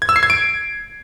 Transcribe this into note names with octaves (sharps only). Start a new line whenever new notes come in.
G#6
E6
C7
G#6
D7